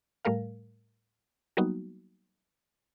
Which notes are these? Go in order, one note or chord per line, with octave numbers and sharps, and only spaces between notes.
A2 G3 A3 A#4 F5
F#3 G3 A#3 B3 D#4 F#4